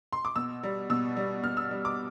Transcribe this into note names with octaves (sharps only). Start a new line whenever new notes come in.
C6
D6
B2 E6
G3
B2 E6
G3
B2 F6
E6
G3
D6